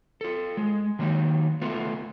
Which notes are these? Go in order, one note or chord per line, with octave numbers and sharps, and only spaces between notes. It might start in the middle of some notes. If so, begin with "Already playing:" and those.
F4 A4
G#3
D#3 F#3 A#3 C#4 D#4
A3 B3 F4